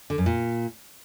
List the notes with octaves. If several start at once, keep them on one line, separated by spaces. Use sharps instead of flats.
D3
F#2
A#2